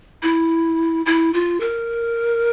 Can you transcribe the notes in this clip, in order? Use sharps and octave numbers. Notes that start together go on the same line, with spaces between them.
E4
E4
F4
A#4